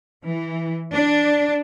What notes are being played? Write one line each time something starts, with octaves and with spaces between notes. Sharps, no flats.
E3
D4